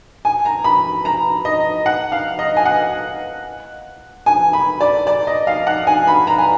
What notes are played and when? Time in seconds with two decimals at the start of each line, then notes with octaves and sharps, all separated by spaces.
0.25 G#5
0.45 A#5
0.64 B5
1.05 A#5
1.45 D#5
1.86 F#5
2.12 F5
2.39 D#5
2.57 G#5
2.65 F#5
4.26 G#5
4.53 B5
4.81 D5
5.07 D5
5.27 D#5
5.47 F5
5.67 F#5
5.87 G#5
6.08 B5
6.27 A#5
6.38 G#5